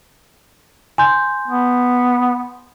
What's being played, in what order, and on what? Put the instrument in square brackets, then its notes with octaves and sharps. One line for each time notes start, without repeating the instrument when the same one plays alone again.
[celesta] G#5 C6 G6
[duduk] B3